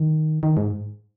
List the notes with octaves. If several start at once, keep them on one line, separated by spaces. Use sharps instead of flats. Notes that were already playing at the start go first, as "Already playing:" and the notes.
Already playing: D#3
D#3
G#2